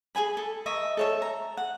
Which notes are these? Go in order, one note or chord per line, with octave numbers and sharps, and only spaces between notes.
G#4 A4 G#5 B5
A4
A#4 D#5 E5 C#6
A4 C#5 E5
A#5
F#5